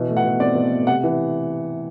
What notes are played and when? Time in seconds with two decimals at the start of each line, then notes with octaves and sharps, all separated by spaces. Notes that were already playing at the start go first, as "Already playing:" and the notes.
Already playing: B2 E3
0.09 A3
0.17 F#5
0.24 B2
0.40 C4 D5
0.55 B2
0.72 A3
0.87 C3 F#5
1.03 E3